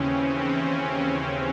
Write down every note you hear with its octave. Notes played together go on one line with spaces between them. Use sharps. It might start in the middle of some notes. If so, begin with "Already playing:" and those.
Already playing: D#2 C#3 E3 C4 C#4
C#4